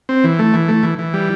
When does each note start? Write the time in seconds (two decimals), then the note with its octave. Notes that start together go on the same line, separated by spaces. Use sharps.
0.09 C4
0.24 E3
0.39 A3
0.54 E3
0.68 A3
0.83 E3
0.99 E3
1.13 G3